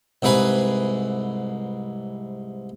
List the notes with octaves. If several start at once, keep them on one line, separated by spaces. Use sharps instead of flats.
C2 G#2 G#4 B4 G#5